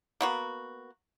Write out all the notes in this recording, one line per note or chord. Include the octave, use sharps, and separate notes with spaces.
A#3 B3 F#4